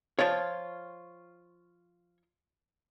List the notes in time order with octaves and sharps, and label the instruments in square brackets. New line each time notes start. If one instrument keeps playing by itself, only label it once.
[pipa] F3 F4 [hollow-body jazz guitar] C#5